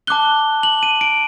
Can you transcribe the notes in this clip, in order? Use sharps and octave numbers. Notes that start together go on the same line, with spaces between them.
A5 D6 F#6 G7
F#7
D#7
D7